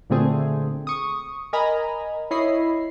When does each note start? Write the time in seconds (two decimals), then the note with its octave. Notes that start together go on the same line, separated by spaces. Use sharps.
0.10 A#2 D3 A3 C4 G#4
0.87 C#6 D#6
1.53 A#4 D#5 G#5 A#5 B5
2.31 E4 C#5 D#5 B5 C7